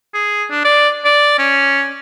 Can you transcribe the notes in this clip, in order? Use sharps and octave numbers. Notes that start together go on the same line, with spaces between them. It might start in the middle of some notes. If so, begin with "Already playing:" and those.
G#4
D4
D5
D5
C#4